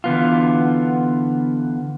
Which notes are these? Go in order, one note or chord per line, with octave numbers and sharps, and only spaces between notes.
D3 E3 B3 F4